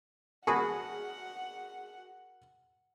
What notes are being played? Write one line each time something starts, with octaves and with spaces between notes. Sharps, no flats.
F#4 G#4 A#4 F#5 A5 B5